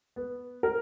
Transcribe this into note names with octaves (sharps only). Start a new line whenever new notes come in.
B3
A#4